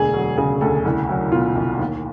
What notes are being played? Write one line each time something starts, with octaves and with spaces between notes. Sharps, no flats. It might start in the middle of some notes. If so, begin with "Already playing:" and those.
Already playing: E1 D2 G#4
F#3
C#3 G#4
D2 A4
C2
F#3
B2 F4
C2
D#2